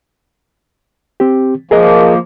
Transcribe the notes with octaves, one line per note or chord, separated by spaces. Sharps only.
C4 G4
F3 A#3 G#4 A#4 D#5